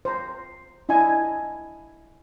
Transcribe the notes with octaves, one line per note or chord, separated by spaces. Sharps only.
C5 A#5
D4 E4 D#5 G#5